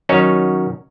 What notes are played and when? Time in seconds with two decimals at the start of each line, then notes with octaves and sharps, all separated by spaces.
0.09 D#3 F#3 C#4 D#4 F#4 C#5